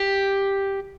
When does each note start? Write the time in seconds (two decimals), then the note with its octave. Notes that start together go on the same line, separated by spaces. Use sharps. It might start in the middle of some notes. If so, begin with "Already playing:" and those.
Already playing: G4